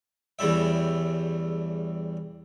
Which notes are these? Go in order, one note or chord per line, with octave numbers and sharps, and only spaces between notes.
E2 C#3 G3 E5